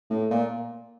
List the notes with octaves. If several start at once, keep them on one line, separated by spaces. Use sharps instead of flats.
A2
A#2